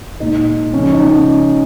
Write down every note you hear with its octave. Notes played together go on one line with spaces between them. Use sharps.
A#2 G#3 D#4
C#3 F3 G#3 C#4
D#4
C#4